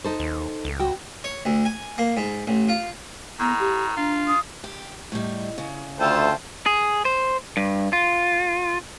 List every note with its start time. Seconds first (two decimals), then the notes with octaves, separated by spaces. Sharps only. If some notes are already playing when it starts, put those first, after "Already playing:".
0.04 D#4 A4 C5
0.19 D#2
0.65 C#2
0.79 F#4 G5
1.24 C#5
1.45 D2
1.65 G#5
1.98 A#3
2.17 G#2
2.47 A1
2.69 F4
3.40 A2 B3 A#5
3.60 G4
3.97 D4 F4
4.27 D#6
4.64 G4
5.12 A2 G3 D#5
5.58 C#3
5.99 D2 F4 A4 C5 E5 G5 A5
6.66 G#4
7.05 C5
7.57 G2
7.93 F4